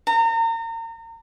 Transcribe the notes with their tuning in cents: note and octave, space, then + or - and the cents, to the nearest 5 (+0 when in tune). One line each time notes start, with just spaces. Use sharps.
A#5 -35